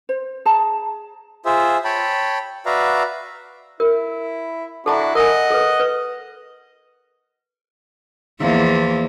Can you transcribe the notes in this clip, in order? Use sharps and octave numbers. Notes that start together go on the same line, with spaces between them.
C5
G#4 A5 A#5
F4 G#4 C5 E5
C#5 G5 A5 B5
F#4 B4 D5 E5 F5 A#5
E4 A#4
D4 E4 F#4 A4 A5 A#5
A#4 D#5 F#5 G#5
A4 B4
B4
E2 F3 A#3